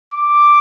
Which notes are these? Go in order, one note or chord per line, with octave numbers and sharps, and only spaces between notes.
D6